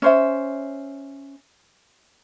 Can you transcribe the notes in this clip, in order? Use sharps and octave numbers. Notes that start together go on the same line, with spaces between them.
C#4 C5 E5